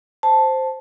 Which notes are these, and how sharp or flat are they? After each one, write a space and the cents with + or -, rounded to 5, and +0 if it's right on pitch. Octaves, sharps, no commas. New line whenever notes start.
C5 +0 A5 +0